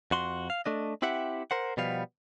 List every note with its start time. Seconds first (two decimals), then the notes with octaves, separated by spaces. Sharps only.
0.11 F2 F#4 C6
0.50 F5
0.66 A3 D4 D#5
1.02 C4 E4 G4 E5 F#5
1.51 A#4 C5 F#5
1.77 B2 F3 G3 B3 F5